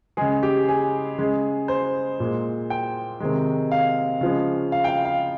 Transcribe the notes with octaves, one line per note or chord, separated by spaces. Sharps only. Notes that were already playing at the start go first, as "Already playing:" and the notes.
C#3 G#3 G#4
G4
G#4
C#3 G#3
C5
A#2 G#3
G5
C3 D#3 G#3
F5
C#3 F3 G#3
F5
G5
F5
F5